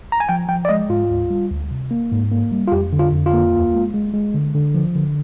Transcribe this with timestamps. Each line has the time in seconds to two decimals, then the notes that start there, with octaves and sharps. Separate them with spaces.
0.12 A#5
0.20 G#5
0.29 F3 G5
0.48 F3 G5
0.65 D5
0.69 G#3 D#5
0.89 G#2 F4
1.10 D2
1.30 G3
1.50 D2
1.71 C3
1.91 A#3
2.11 G#2
2.32 A#3
2.52 G3
2.68 F4
2.72 F2 G4
2.93 D3
2.99 F4
3.12 F2
3.26 F4
3.34 A#3
3.54 D#2
3.74 G#3
3.94 G#3
4.14 G#3
4.34 D3
4.54 D3
4.74 F3
4.96 D3